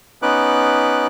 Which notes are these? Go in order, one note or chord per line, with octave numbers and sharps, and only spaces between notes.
B3 C#4 D#4 B4 D6 F#6